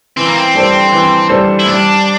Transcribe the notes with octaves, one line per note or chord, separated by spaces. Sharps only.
E3 C4
A#3
C4
G3 D4 A4 C5
E3
G3 D4 A4 C5
E4
G3 D4